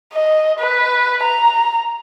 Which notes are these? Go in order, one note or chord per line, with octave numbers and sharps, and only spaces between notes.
D#5
B4
A#5